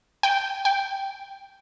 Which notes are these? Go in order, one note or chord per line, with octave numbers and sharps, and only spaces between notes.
G5
G5